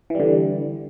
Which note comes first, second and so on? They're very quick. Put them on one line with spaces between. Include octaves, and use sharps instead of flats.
E3 G3 D3